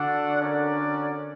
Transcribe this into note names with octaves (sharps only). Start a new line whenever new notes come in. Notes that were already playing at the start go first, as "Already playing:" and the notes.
Already playing: D3 D4 F#4 A4 D5 F#5
C#4 F#4 A#4 D5